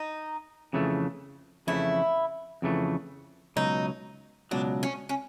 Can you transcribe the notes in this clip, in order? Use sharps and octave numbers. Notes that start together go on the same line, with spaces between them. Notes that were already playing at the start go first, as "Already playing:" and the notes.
Already playing: D#4
F2 C#3 E3 A3
F2 C#3 E3 A3 E4
F2 C#3 E3 A3
C#2 B2 F#3 D#4
C#2 B2 F#3 D4
C#4
C#4